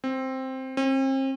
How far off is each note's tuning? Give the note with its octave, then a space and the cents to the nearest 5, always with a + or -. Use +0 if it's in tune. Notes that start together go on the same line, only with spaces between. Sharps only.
C4 +5
C4 +40